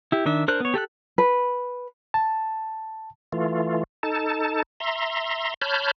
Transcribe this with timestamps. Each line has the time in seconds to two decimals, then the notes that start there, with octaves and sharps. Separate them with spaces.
0.12 E4 G4
0.26 D#3 D4 E5
0.48 D4 A#4 C5 F#6
0.60 B3 C#5
0.74 G4 A4 G5 F#6
1.18 B4
2.14 A5
3.32 E3 A3 F4
4.03 D#4 A4 A5
4.80 E5 A#5 C6
5.62 C#5 A5 B5 F6 G6